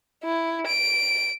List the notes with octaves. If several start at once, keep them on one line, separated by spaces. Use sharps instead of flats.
E4
D7